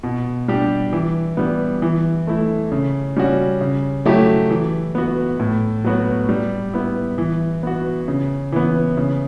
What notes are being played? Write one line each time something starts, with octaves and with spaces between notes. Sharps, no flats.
B2
G3 D4 G4
E3
G3 B3
E3
A3 E4
C#3
G3 C#4 F#4
C#3
F#3 A3 E4 G4
E3
B3 F#4
A2
F#3 B3 F#4
G3
B3 E4
E3
B3 F#4
C#3
E3 B3
C#3